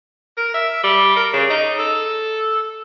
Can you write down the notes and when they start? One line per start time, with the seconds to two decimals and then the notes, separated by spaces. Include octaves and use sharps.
0.37 A#4
0.55 E5
0.84 G3
1.17 A#4
1.34 C#3
1.50 D#4
1.79 A4